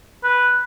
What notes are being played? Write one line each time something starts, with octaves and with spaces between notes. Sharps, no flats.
B4